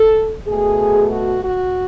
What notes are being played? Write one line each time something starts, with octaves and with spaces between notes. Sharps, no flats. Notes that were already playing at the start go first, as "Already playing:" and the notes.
Already playing: A4
B2 A3 G#4
F#4
F#4